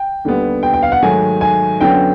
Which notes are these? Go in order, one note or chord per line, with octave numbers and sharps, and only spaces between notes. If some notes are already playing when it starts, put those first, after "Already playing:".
Already playing: G5
D#2 D3 G3 B3
G5
G5
F5
F#5
G#2 D#3 F#3 A3 G#5
G#5
F#2 D3 F#3 B3 G5